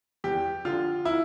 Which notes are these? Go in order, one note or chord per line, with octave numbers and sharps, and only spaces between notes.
E2 G4
D3 F3 F4
E4